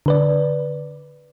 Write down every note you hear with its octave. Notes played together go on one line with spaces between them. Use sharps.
D3 B4 D5